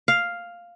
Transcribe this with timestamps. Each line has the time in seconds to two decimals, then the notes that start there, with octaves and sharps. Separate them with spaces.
0.08 F5